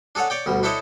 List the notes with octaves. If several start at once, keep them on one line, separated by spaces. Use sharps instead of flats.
D4 G#4 A4 C#5 F#5
C#5 D5 G5
D2 B2 G3
D4 E4 A4 C5 C#5 D#5